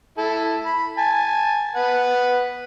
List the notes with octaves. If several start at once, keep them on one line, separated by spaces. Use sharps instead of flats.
E4 A4
B5
G#5 A5
B4 F#5